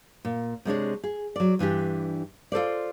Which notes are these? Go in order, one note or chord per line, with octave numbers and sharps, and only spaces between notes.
A#2
C3 G#3 D4 C#5
G#4
F#3 D5
G2 E3 D4 G4
F4 A4 C5 D5